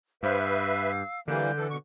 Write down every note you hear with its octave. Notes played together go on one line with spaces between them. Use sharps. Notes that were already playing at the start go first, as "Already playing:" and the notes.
G2 B4 C5 E5 F5
F5 E6
D3 E3 G3 A#3 G6
E3 A4
B2 C#6